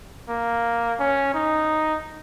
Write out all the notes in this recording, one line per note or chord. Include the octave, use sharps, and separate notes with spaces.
A#3
C#4
D#4